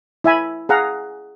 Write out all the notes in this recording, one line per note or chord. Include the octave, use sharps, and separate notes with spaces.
E4 E5 G#5 B5
G#4 F5 F#5 A#5